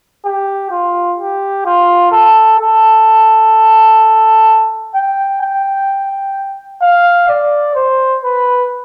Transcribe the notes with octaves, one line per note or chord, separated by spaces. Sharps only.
G4
F4
G4
F4
A4
A4
G5
G5
F5
D5
C5
B4